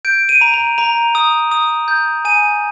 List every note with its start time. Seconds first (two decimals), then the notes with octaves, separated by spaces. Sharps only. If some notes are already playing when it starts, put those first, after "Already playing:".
0.05 G6 D7
0.29 D#7
0.41 A#5
0.54 F7
0.78 A#5 F7
1.15 D#6
1.52 D#6
1.88 G6
2.25 G#5 D#7